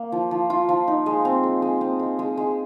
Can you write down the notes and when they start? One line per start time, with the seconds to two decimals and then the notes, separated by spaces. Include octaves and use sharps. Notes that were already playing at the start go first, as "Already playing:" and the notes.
Already playing: A#3
0.12 F3
0.31 F3
0.50 F4
0.69 F3
0.88 D#4
1.06 G#3
1.25 C4
1.43 G#3
1.62 G#3
1.81 C4
1.99 G#3
2.19 G#3
2.37 G#3